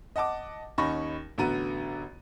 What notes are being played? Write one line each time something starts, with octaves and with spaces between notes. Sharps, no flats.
D#5 F#5 A5 D6
D#2 C#4 D#4 B5 C#6 A#6
A1 D3 B3 F#4 A#5 D#7